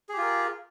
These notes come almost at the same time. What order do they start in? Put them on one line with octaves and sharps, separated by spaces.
G#4 G4 F4 A#4